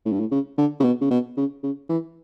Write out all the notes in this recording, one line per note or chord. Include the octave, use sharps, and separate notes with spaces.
A2
G2
A2
C#3
D3
C#3
B2
C#3
B2
C#3
C#3
E3